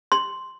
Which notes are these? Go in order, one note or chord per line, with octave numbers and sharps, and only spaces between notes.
C6